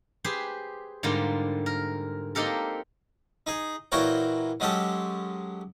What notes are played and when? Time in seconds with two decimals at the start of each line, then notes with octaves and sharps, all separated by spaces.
0.24 G4 G#4 B4 C5
1.03 G#2 D3 G3 A#3 F4
1.66 A#4
2.35 A#3 C4 D#4 G4 A4 A#4
3.47 D#4 G#4
3.92 A#2 E3 F#4 A#4 C#5 G5
4.60 F#3 G#3 C#4 G4 A4